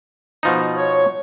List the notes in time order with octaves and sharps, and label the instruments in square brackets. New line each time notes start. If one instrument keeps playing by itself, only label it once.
[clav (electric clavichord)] B2 F3 D#4
[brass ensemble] C#5